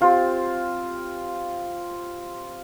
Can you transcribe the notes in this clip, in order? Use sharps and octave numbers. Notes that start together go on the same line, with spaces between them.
C4 F4 G4 C5